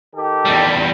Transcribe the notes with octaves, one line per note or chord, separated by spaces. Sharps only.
D#3 G4 A4
E2 G3